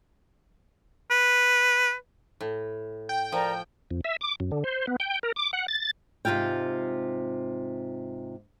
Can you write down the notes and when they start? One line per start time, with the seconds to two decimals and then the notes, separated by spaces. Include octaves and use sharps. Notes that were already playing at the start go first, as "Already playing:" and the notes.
1.10 B4
2.41 A2
3.09 G5
3.32 F3 A#4 D5 A#5
3.91 F2
4.04 E5
4.21 D6
4.40 F#2
4.52 D3
4.64 C5
4.87 B3
5.00 G5
5.23 A#4
5.36 D6
5.53 F#5
5.68 A6
6.25 G#2 C3 F#3 F4 F5 G5